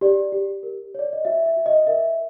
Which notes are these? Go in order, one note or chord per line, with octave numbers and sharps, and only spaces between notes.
G4 D5
G4
A#4
C#5 D5
D#5
F#4 E5
E5
F#4
D#5
A#4 E5